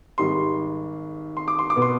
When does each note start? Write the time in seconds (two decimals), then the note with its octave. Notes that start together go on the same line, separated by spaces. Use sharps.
0.18 G#1 G#2 G3 C6
1.37 C6
1.48 D6
1.59 C6
1.70 D6
1.76 B2 B3
1.82 C6